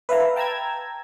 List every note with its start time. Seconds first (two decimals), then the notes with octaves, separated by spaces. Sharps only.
0.09 B4 E5 F5 A5 A#5
0.36 G5 A5 A#5 E6 G#6